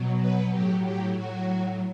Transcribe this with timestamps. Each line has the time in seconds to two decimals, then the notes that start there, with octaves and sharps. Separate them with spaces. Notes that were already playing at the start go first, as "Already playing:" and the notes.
Already playing: B2 F#3
0.21 B4
0.52 A2 F#3 G4
0.84 G4
1.16 A2 F#3 F#4